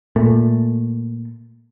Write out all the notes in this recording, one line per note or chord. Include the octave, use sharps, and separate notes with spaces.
A#2 A3